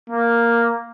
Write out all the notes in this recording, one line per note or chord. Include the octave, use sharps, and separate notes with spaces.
A#3